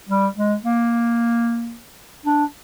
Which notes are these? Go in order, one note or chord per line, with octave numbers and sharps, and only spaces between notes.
G3
G#3
A#3
D4